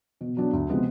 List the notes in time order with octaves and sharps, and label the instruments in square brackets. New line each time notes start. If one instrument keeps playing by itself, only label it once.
[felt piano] B2
F#3 B3 D4
D2
C3 F3 G#3 B3